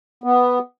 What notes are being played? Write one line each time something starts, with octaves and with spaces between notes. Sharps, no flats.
B3